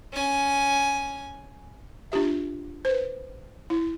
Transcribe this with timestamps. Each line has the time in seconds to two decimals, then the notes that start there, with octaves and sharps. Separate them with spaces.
0.13 C#4 G#5
2.12 D4 F4 G4 E5
2.85 B4 C5
3.70 E4